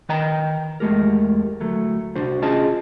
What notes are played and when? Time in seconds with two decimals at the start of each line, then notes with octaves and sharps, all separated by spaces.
0.09 D#3 B4 D#5 G5 A#5
0.80 E2 G#3 A3 G4 A#4
1.60 D2 F#3 A3
2.16 C2 D4 F#4 C5
2.42 C#4 F4 G#4 D#5 A5